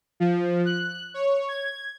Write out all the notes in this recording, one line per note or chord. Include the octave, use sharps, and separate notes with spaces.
F3
F#6
C#5
G#6